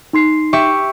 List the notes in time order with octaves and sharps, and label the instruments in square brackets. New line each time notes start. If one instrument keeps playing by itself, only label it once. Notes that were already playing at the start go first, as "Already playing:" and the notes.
[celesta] D#4 C6 C7
[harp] G4 E5 C#6